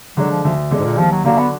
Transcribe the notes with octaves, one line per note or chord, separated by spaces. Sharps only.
D3 F#3 G#3 D4
F3
D2 F3
D3 G#3 D4
G#2
A#2
D#2 F3
F#3
D3 F#3 A#3 D4 F#4
B3